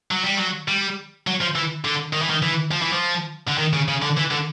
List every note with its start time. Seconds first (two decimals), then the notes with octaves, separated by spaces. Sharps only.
0.11 F#3
0.24 G3
0.37 F#3
0.68 G3
1.27 F#3
1.41 F3
1.56 E3
1.85 D3
2.13 D#3
2.22 E3
2.30 D#3
2.42 E3
2.71 F3
2.82 E3
2.93 F3
3.48 D3
3.58 D#3
3.73 C#3
3.88 C#3
4.02 D3
4.17 E3
4.31 D3